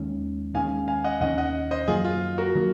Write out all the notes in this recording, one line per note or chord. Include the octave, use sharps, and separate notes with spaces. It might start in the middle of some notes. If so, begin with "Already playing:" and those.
Already playing: D#2 D#3 G#3 C#4
D#2 D#3 G#3 C#4 F5 G#5
F5 G#5
D#5 F#5
D#2 D#3 G#3 C#4 D#5 F#5
D#5 F#5
C5 D#5
F#2 D#3 F#3 A#3 F4 G#4
F4
F#4 A#4
D#3 F#3 A#3